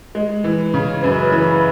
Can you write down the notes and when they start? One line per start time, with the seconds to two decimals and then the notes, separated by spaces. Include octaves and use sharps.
0.15 G#3
0.44 E3
0.74 C#3
1.03 F#2 B4
1.32 E3